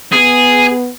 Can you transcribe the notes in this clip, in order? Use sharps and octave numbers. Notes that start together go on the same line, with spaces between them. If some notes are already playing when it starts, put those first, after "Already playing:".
B3 G#4